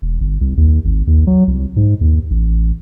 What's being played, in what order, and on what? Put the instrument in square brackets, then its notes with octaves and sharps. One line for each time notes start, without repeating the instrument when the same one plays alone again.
[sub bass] E1
G1
C2
D#2
G#1
D#2
F#3
C2
G#2
D#2
A1